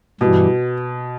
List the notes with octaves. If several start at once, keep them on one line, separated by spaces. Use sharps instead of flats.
G2 B2 E3 G3